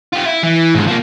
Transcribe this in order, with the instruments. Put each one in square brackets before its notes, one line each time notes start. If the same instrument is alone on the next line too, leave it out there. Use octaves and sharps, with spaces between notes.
[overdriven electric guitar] F4 G4
E4
E3
G#2 D3
F3 A#3